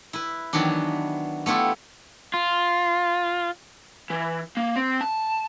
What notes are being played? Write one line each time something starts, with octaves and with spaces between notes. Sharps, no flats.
E4 B4
D#3 E3 F#3 B3 D4
A3 B3 E4 F4 G4
F4
E3
A#3
C4
A5